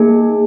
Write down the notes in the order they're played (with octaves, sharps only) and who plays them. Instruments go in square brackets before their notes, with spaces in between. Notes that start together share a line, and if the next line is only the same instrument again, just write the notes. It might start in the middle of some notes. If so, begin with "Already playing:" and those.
Already playing: [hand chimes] A#3 D#4 G#4